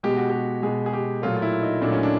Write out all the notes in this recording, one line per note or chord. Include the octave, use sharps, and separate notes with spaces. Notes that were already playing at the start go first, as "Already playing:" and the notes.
B2 G#3 G4
F#4
G4
B2 G#3 G#4
G#4
G4
A#2 F#3 A3 F4
F4
E4
D#4
A#2 F#3 A3 D4
C#4
D4